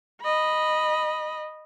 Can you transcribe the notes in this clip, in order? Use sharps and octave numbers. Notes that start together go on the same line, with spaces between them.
D#5 B5